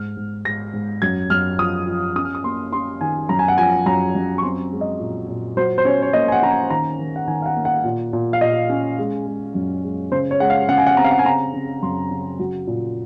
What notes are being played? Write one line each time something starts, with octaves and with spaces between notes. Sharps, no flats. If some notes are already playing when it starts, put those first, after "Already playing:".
Already playing: G#2 F6
G#2
G#2 A#6
G#2
F#2 G#6
F#2 F6
F3 D#6
F3
C#4 D#6
F6
D#6
A#3 C6
C#4 C6
D#3 G#5
F#2 A#5
G#5
F#5
F3 G#5
F#2 A#5
F#2
C#6
C4 C6
G#3
D#5
A#2
A#2
F#3 C5
C5
C#4 C#5
C#5
A#3 D#5
G#5
F#5
C#4 A#5
G#5
D#3 A#5
D#3
F#5
D#3 G#5
F5
F#5
A#3
F#5
A#2
A#2
F5
A#2 D#5
C#4
G#3
G#3
F#2
G#3
C#3 C5
C#5
G#3 F#5
F5
C#3 F#5
G#5
F#5
C4 A#5
F5
F#5
G#5
C#3 A#5
C#3
F#2 C6
C#3
F#3
A#2